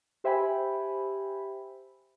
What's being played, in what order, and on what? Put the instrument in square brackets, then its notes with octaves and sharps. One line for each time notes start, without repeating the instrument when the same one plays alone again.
[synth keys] G4 C5 E5 G5 G#5 B5